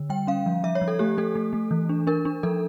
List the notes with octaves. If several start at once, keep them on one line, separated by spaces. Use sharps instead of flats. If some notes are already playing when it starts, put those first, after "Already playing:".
Already playing: D3
G3 G5
C#4 F5
F3
F3 E5
C#5
F3
A4
A3 G4
A3 A4
A3
A3
E3
D4
D4 A#4
D4
F3 A4